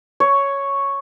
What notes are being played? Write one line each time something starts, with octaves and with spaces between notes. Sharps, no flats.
C#5